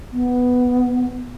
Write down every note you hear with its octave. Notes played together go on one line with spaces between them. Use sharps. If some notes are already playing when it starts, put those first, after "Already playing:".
B3